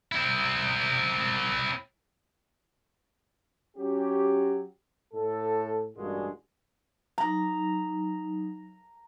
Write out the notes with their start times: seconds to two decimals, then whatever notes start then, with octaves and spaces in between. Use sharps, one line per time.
0.12 C4 E4
3.77 F#3 C#4 F#4 G4
5.13 A2 A4
5.97 A1 G2 A#2 G#3 F#4 G#4
7.18 F#3 D#4 A#5